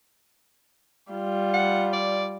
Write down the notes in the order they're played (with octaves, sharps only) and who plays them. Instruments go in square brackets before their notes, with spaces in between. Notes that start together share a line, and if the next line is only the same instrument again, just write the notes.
[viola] G3 F4
[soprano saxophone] F#5
D5